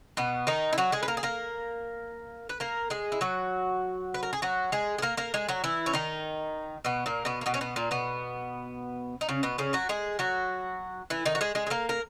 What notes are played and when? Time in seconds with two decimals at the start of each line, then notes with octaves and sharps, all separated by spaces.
0.17 B2 B3
0.47 D#3 D#4
0.73 E4
0.78 F#3 F#4
0.92 G#3 G#4
1.03 B4
1.08 A#3 A#4
1.17 G#4
1.23 A#3 A#4
2.49 B4
2.60 A#3 A#4
2.90 G#3 G#4
3.12 E4
3.21 F#3 F#4
4.14 B4
4.23 A#4
4.33 G#4
4.42 F#3 F#4
4.72 G#3 G#4
4.98 G#4
5.02 A#3 A#4
5.17 A#3 A#4
5.34 G#3 G#4
5.49 F#3 F#4
5.64 E3 E4
5.86 C#4
5.93 D#3 D#4
6.85 B2 B3
7.06 A#2 A#3
7.25 B2 B3
7.41 A#3
7.46 B2 B3
7.54 C#4
7.61 B2 B3
7.76 A#2 A#3
7.91 B2 B3
9.21 D#4
9.29 C#3 C#4
9.43 B2 B3
9.58 C#3 C#4
9.73 F#3 F#4
9.89 G#3 G#4
10.19 F#3 F#4
11.10 E3 E4
11.25 D#3 D#4
11.35 F#4
11.41 G#3 G#4
11.55 G#3 G#4
11.67 G#4
11.70 A#3 A#4
11.89 A#4